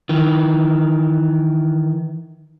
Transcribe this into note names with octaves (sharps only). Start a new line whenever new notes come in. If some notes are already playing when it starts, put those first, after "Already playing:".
D#3 E3